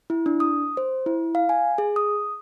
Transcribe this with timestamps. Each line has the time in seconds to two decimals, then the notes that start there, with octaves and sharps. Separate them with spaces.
0.10 E4
0.26 D4
0.40 D#6
0.77 C5
1.06 E4
1.35 F5
1.49 G#5
1.78 G#4
1.96 D#6